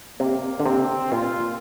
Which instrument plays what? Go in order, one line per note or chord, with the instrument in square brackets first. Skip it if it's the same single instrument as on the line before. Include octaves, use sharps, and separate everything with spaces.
[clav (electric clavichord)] C3 [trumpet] A#3
[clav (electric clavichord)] D3
[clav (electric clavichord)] C3 [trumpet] C4
[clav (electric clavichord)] A#2 [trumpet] F4